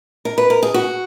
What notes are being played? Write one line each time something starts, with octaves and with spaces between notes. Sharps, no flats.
A#4
B4
A#4
G#4
F#4